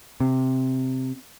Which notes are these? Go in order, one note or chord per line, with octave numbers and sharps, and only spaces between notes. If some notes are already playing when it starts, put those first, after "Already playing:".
C3